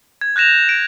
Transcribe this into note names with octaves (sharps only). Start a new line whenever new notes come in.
G#6
F#6 G6 A#6 E7 F7
D7